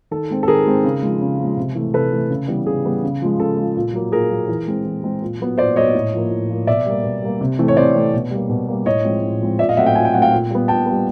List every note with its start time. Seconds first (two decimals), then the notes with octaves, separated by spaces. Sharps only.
0.11 D#3 A4
0.30 G#3 C4
0.43 A4
0.48 D#3 G#4 A#4
0.66 G#3 C4
0.84 C#3
1.02 F3 G#3
1.21 C#3
1.39 F3 G#3
1.57 C3
1.75 E3 A3
1.94 C3 A4 B4
2.12 E3 A3
2.30 C#3
2.48 E3 G3 B3
2.66 C#3 G#4
2.85 E3 G3 B3
3.03 C#3
3.22 F3 G#3
3.39 C#3 A4
3.57 F3 G#3
3.76 A#2
3.94 F#3 A#3
4.12 A#2 G#4 A#4
4.31 F#3 A#3
4.48 E3
4.67 G#3 C4
4.85 E3
5.03 G#3 C4
5.21 A#2
5.40 F#3 B3
5.58 A#2 C5 D5
5.76 F#3 B3 C#5 D#5
5.94 A2
6.13 F3 A#3
6.31 A2
6.49 F3 A#3
6.67 B2 D5 E5
6.86 G3 A#3
7.03 B2
7.22 G3 A#3
7.41 C3
7.59 E3 A3 C4
7.68 C#5
7.76 C3 C5 D5
7.95 E3 A3 C4
8.13 B2
8.31 G3 A#3
8.49 B2
8.68 G3 A#3
8.86 A2 C#5 D#5
9.04 F3 G#3 C4
9.23 A2
9.41 F3 G#3 C4
9.59 A#2 D5 E5
9.69 D#5 F5
9.77 F#3 A3 C4 E5 F#5
9.86 F5 G5
9.95 A#2 G#5
10.05 G5
10.14 F#3 A3 C4 F#5
10.22 F5 G5
10.32 A#2
10.51 G3 B3
10.68 A#2 G5 A5
10.86 G3 B3